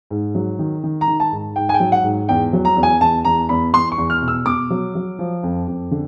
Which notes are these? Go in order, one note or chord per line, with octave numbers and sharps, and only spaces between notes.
G#2
F#3
D#3
D#3
A#5
D#3
A5
G#2
G#2 G5
G#5
G5
F#3
F#5
G#2
E2 G5
F#3
A#5
E2
G#5
E2 A5
E2 A#5
E2 B5
E2 C6
C#6
E2
F6
B2
E6
B2 D6
F#3
F#3
F3
F2
F2
D3